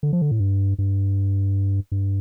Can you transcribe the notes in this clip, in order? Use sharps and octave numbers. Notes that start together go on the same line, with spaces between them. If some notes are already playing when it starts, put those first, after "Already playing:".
D3
F3
D3
A2
G2
G2
G2